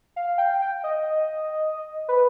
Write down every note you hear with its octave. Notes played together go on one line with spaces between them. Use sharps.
F5
G5
G5
D#5
B4